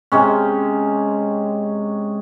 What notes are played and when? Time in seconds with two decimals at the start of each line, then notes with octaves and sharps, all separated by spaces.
0.12 C3 G#3 C#4